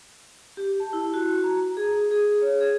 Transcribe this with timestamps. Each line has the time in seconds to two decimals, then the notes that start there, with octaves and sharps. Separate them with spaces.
0.57 G4
0.80 A5
0.93 E4
1.14 F#4
1.44 A#5
1.77 G#4
2.11 G#4
2.42 C#5
2.61 G#4